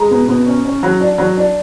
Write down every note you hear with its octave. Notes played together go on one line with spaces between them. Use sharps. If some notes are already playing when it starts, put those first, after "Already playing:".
Already playing: G#3 A#5
B2
B2
C#4
C#4
F#3
D4
F#3
D4